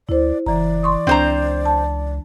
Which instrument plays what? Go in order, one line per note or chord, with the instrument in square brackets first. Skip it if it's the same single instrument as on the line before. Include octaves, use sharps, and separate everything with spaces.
[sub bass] D2 [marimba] E4 C5 [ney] D5
[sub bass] F#1 [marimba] E3 A#5 [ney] D5
[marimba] C6 C#6 D#6
[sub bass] C#2 [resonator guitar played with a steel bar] C4 C5 A#5 [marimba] D4
[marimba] A5